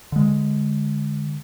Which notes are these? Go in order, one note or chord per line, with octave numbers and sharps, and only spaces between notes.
D3 G#3